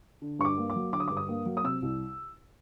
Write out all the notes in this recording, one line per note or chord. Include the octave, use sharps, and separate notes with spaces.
D3
G2 C#6
D6
A#3
D6
F#3
D3 D6
D#6
G2 D6
D#6
A#3
F#3
D#6
C3 E6
C2